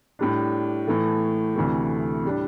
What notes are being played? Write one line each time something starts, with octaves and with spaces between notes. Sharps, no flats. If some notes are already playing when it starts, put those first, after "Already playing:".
A2 G3 D4
A2 E3 A3
D2 C3 E3 A3
A2 G3 D4